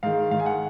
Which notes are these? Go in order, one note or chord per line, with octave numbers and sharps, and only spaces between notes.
G#2 D#3 F5
G#2 D#3 F5
G#5
F#5